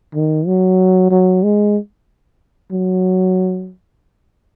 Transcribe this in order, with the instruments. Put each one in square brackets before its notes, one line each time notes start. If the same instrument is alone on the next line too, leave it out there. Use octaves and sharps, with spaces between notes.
[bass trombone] D#3
F#3
F#3
G#3
F#3